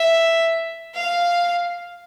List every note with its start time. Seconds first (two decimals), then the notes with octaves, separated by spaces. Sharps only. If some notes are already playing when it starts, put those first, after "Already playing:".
Already playing: E5
0.94 F5